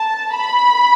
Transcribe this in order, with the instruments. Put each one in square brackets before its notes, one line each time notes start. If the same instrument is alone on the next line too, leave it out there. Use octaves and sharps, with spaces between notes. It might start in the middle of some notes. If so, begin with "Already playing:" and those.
Already playing: [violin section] A5
B5